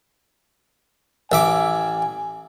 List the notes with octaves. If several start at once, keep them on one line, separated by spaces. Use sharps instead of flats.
A1 E5 G#5 D6